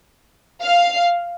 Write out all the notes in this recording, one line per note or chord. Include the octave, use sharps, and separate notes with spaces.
F5